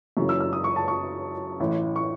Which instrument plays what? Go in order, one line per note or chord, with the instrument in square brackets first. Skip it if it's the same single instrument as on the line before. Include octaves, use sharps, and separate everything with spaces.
[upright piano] F#1 F#2 C#3 E3 C#6
E6
E6
D#6
C#6
A5
C#6
A1 A2 E3
C#6